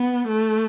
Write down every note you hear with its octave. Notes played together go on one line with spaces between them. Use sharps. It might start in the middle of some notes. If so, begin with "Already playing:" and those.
Already playing: B3
A3